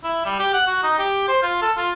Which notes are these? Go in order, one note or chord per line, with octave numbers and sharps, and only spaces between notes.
E4
G3
G4
F#5
F#4
D#4
G4
C5
F4
A4
F4